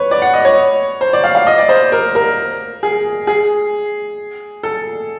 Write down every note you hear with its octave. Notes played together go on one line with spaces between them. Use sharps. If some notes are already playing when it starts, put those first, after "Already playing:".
Already playing: B4 C#5
D5
F#5
D#5
C#5
C5
D5
F5
F5
D#5
D5
C5
A#4
A#4
G#4
G#4
A4